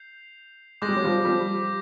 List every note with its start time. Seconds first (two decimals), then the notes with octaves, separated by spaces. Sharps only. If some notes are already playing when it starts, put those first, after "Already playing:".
Already playing: G6 C7 F7
0.82 G#3 D6 G6 A#6
0.89 G3
0.97 F#3
1.04 F3 G3
1.25 F3 G3